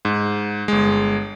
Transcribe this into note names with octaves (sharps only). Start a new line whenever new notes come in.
G#2
G1 G#3